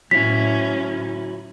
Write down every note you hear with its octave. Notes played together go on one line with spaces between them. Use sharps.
A2 F#3 C#4 E4 B6